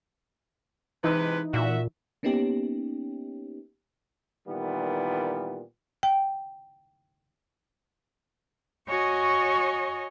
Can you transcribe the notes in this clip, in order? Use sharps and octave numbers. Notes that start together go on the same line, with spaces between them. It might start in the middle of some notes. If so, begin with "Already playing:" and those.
C3 E3 G#3 D#4 B4
A#2 F#4 E5
A#3 B3 C#4 D#4 G4
A#2 D#3 E3 G3 B3
G5
F#4 C#5 D#5 G#5 C#6